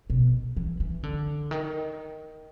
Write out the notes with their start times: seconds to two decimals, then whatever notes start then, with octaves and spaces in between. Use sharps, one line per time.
0.10 B2
0.57 E3
0.80 E3
1.03 D3
1.51 D#3